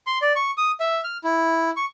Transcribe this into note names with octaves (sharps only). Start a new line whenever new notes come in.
C6
D5
C#6
D#6
E5
F6
E4
C#6